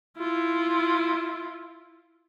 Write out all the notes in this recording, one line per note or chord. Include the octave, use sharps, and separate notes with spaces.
E4 F4